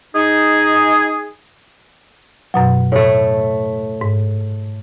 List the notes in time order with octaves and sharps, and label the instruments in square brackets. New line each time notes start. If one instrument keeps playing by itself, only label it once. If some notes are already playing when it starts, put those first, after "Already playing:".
[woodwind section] D#4 G#4
[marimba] F#2 B2 F#3
[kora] A2 A3
[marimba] G#2